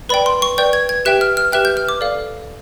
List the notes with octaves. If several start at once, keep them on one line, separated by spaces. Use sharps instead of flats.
B4 D5 G5 B5
C6
C#6
B4 D5 G5 G6
G#6
G#6
G4 B4 E5 G5 F#6
F6
F6
G4 B4 E5 G5 F#6
G6
F6
D6
A4 D5 F5